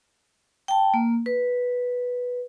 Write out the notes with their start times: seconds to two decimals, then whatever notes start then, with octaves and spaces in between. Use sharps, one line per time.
0.68 G5 A5
0.94 A#3
1.26 B4